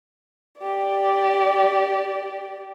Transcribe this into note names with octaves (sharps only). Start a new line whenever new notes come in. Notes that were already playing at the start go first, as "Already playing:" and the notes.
G4 D5